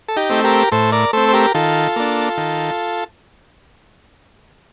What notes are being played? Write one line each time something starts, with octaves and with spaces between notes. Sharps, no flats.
A4
D#4 G4
A3 C4
G4 A#4
A2 A4 C5
A#4 D5
A3 C4 A4 C5
C5
G4 A#4
D#3 F4 A4
A#3 D4
D#3